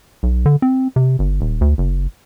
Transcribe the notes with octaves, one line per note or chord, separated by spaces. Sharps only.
B1
D3
C4
C3
G1
D#1
D2
F#1